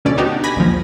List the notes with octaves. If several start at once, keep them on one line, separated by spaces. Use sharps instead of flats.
D2 B2 D3 C#4 D5
B3 D4 D#4 F#4 G4
G#5 B5 A#6
A#1 D#2 F3